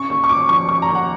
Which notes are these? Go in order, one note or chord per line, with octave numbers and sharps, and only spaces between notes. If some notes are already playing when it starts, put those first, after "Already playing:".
Already playing: C#3 C#6
D#2
C#6
E1 D6
F3 C#6
C#3 C#6
A#5
D#2
F#5